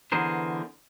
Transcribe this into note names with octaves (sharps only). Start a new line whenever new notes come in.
D3 E3 B3 G#4 A#4 C5